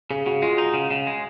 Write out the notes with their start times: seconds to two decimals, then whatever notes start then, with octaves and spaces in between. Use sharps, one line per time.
0.11 C#3 G#4
0.26 C#3 F#4
0.42 G#3 F4
0.58 D#4
0.74 C#3
0.91 C#3
1.07 G#3